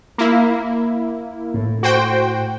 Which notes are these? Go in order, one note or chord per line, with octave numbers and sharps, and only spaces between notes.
A#3 E4
A2
F#4 C5 G5